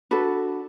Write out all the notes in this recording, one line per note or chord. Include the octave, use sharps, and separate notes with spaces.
D4 F#4 A4 B4